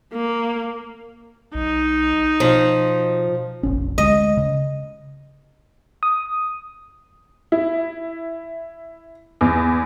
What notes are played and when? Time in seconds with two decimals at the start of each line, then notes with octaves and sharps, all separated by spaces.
0.13 A#3
1.54 B1 D#4
2.40 B2 F3
3.63 F1 A#1 C#4
3.98 D2 G#3 D#5
4.37 C#3
6.03 D#6
7.52 E4
9.41 E2